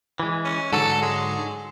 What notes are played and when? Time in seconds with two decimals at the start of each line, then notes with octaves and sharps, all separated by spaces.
0.20 E3 G#3
0.45 C#4
0.72 G#2 D3 F#3 A4
1.02 G#3